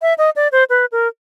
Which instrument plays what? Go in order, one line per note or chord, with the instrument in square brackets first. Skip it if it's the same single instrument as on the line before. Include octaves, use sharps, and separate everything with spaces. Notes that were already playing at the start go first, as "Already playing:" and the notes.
[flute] E5
D#5
D5
C5
B4
A#4